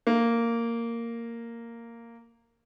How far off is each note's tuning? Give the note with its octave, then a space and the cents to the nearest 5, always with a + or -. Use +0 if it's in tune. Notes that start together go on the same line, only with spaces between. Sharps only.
A#3 -10